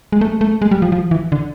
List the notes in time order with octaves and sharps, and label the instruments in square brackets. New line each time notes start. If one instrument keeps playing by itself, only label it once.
[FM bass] G#3
A3
A3
G#3
G3
F3
F3
E3
D3